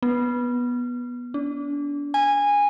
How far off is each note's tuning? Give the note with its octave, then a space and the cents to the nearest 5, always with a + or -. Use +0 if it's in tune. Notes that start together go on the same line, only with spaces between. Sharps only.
B3 -15
D4 -30
G#5 -15